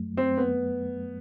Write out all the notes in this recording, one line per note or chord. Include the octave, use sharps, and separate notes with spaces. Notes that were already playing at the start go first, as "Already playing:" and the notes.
Already playing: F#2 F#3 A3
C4
B3